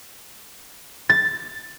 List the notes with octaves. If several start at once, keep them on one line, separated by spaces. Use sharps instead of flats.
A6